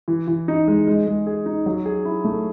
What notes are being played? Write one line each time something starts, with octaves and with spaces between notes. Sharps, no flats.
E3
E3
D#4
G#3
G#3
G#3
G#4
D#4
F#3
G#4
E4
A3